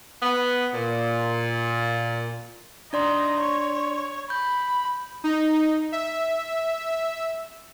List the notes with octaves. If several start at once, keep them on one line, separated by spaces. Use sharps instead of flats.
B3
A#2
D4 D#4 D5 C6
C#5
B5 G6
D#4
E5